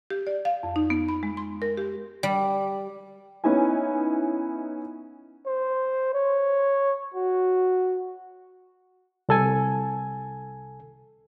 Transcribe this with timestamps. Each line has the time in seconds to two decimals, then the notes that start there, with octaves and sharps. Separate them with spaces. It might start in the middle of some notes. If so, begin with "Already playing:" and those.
0.10 G4
0.27 D5
0.45 F5
0.63 F2
0.76 D#4
0.90 B3
1.09 B5
1.23 G#3
1.37 C6
1.62 A#4
1.77 G4
2.23 G3
3.44 B3 C#4 D#4 E4 G#5
5.47 C5
6.14 C#5
7.14 F#4
9.29 C2 A4 G#5